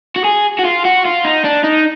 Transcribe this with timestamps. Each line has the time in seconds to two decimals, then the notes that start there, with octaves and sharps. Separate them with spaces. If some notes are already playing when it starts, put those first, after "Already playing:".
0.16 F#4
0.24 G#4
0.59 F#4
0.65 F4
0.85 F#4
1.05 F4
1.25 D#4
1.44 D4
1.64 D#4